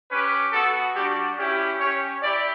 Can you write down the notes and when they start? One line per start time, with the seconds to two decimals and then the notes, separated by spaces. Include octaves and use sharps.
0.11 C#4 G4 B4
0.53 B3 F#4 A4
0.95 G3 D4 F#4 G4
1.37 C#4 E4 G4
1.80 C#4 G4 C#5
2.22 E4 G4 D5